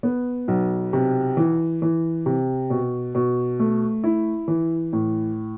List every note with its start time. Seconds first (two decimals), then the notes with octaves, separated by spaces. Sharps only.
0.03 B3
0.48 B1
0.93 C3
1.37 E3
1.82 E3
2.26 C3
2.70 B2
3.15 B2
3.60 A3
4.04 E4
4.48 E3
4.93 A2